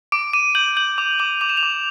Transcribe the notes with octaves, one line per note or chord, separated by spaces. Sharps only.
D6 D7
D6 D#7
G6 F#7
G6 F#7
D6 F7
D6 F#7
D6 F7
E7
F7
D6